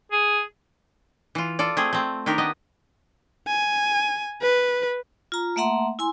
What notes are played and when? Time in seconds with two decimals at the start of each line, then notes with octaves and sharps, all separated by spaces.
0.12 G#4
1.35 E3 F4
1.59 F4 A4 D5
1.77 A3 C4 G#4
1.93 A3 C4
2.26 D#3 D4 G4 A#4
2.38 B3 D#5
3.47 G#5
4.42 B4
5.32 F4 A#5
5.56 A3 A#3 E5 F#5 A#5 C6
5.99 E4 G#5 C6